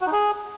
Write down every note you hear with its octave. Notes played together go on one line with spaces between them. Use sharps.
F#4
D#4
G#4